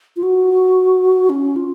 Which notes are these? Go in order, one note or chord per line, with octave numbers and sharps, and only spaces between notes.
F4
F#4
C#4
F4